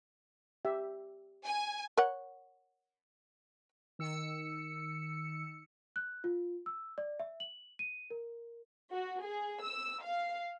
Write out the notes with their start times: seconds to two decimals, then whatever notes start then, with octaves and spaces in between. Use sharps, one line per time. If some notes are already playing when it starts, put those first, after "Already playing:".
0.65 G4 E5
1.46 G#5
1.97 A#4 C#5 F#5
3.99 D#3 E6 C#7
5.96 F#6
6.24 F4
6.66 E6
6.98 D5
7.20 E5
7.40 F#7
7.79 D#7
8.10 A#4
8.91 F#4
9.22 G#4
9.62 E6
10.02 F5